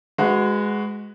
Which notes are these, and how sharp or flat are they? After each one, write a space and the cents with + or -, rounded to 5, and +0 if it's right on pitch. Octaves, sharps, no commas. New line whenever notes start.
G#3 +0 F#4 +0 B4 +25